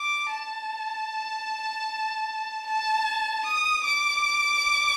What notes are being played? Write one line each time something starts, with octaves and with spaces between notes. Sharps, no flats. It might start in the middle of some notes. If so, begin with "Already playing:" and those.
Already playing: D6
A5
A5
D#6
D6